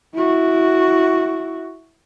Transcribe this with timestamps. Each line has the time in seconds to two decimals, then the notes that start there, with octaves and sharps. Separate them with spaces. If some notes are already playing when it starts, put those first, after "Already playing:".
0.14 E4 F#4